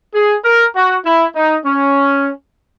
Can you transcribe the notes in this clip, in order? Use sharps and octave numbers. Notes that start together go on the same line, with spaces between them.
G#4
A#4
F#4
E4
D#4
C#4